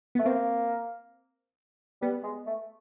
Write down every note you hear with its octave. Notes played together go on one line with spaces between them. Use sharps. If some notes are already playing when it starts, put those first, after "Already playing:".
A3 B3
A#3 C4
G3 B3
G#3
A3